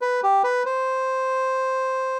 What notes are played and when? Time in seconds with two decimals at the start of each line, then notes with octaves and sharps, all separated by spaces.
0.01 B4
0.23 G4
0.44 B4
0.66 C5